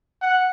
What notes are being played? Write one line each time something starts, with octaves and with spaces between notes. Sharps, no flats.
F#5